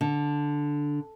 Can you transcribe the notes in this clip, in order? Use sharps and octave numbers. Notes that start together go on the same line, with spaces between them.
D3